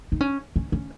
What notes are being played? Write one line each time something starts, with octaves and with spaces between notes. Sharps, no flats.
D#4
C#4
C#4
C#4